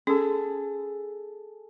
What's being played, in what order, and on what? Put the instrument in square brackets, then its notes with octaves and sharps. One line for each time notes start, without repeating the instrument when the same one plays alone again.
[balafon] C#4 [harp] G#4 A4